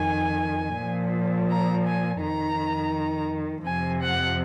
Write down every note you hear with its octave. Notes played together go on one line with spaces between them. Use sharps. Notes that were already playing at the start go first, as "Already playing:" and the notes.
Already playing: F2 D#3 G#5
A#2 F3
A#5
G#5
F2 D#3 A#5
F2 C3 F3 G#5
F#5